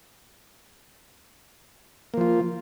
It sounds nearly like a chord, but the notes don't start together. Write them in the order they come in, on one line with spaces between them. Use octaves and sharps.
A#3 F3 F4